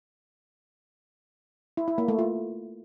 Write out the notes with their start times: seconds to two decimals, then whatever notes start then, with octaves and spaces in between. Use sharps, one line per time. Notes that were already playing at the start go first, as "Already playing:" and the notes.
1.77 E4
1.88 E4
1.98 A#3
2.08 A3
2.19 F4